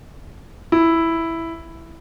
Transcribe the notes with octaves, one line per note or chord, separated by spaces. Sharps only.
E4